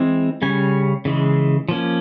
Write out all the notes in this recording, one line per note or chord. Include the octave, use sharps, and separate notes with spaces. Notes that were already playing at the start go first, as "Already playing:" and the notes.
Already playing: E3 G#3 C4
C#3 G3 C#4 G#5
C#3 E3 G#3
F3 A#3 C#4